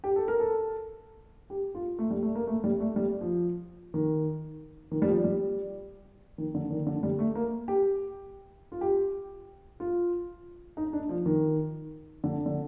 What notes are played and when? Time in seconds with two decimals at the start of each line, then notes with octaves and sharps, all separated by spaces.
0.04 G4
0.16 A4
0.28 A#4
0.40 A4
1.50 G4
1.75 F4
1.99 A3
2.11 G3
2.23 A3
2.35 A#3
2.47 A3
2.64 G3
2.80 A3
2.96 G3
3.21 F3
3.94 D#3
4.91 D#3
5.02 G3
5.08 F3
5.24 G3
6.38 D#3
6.55 D3
6.70 D#3
6.87 D3
7.03 G3
7.19 A3
7.35 A#3
7.68 G4
8.72 F4
8.81 G4
9.80 F4
10.77 D#4
10.93 D4
11.09 F3
11.26 D#3
12.24 D3
12.46 D3